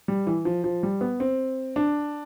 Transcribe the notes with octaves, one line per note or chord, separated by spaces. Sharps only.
G3
E3
F3
F3
G3
B3
C4
D4